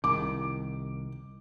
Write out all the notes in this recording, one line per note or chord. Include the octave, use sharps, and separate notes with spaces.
C2 D#3 D6